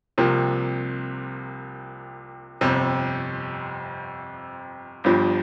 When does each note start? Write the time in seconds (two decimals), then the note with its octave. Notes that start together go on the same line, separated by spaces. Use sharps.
0.18 C2 C3 F3 A#3
2.61 G1 F2 C3
5.04 G1 G2 F3